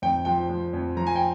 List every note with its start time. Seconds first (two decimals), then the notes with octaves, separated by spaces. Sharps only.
0.02 F2 G5
0.25 F3 G5
0.49 F3
0.73 F2
0.97 F3 A#5
1.07 G#5
1.16 G5